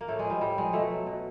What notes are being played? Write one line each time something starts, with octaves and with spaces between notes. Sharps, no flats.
A#3
A2 A3
G#3
F3 G3
A2 G3
F3 G#3
B2 A3
F#3
B2